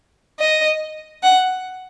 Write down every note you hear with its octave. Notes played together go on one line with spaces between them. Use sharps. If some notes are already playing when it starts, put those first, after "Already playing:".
D#5
F#5